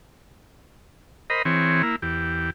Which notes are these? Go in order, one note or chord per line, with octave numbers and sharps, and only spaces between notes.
A#4 C5 D#5 B5
E3 C4 G#4 C#5
A#3 E4
E2 G4